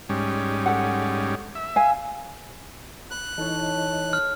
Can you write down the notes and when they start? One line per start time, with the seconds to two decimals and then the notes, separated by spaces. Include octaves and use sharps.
0.09 G#2 G3 C#4
0.66 A4 F#5
1.55 E5
1.76 F5 G#5
3.11 B5 F#6
3.38 E3 D#4 A4 C#5
4.13 F6